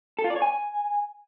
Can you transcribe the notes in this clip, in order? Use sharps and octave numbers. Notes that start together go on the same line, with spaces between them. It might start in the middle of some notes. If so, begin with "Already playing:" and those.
A4
F4
D5
C#5
G#5